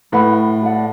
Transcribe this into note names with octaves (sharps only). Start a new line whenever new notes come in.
A2 E4 B4 F#5 B5
A4 D5 F#5